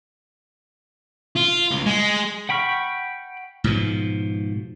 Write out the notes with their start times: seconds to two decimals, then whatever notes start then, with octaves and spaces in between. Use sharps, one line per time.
1.36 F4
1.72 C#2
1.86 G#3
2.49 F#5 G5 B5 C#6 F6
3.64 G#2 B2 F3